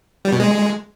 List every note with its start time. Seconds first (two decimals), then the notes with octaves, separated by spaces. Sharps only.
0.25 G3
0.32 B2
0.40 G#3